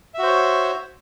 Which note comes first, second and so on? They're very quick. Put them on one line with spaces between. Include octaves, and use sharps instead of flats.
E5 F#4 C5 C#5